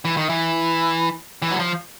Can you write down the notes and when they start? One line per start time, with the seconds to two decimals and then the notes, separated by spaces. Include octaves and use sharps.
0.05 E3
0.17 D#3
0.29 E3
1.42 E3
1.51 F#3
1.59 F3